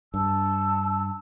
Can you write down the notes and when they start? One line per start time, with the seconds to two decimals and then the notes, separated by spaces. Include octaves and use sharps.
0.14 G2 D4 A5 E6